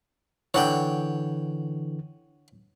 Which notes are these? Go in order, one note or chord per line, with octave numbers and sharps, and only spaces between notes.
D3 E3 C#5 F#5 G5